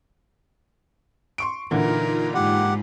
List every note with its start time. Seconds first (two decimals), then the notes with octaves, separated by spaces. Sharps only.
1.38 C6 C#6 D7
1.71 A#2 D3 E3 D#4 F4 A#4 B5
2.35 G#2 G4 F#5